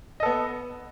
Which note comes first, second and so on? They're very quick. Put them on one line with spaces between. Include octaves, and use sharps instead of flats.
D#5 A4 B3